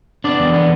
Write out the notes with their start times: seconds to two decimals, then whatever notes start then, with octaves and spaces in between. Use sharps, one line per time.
0.24 B3 D4 D5
0.40 E2
0.54 B3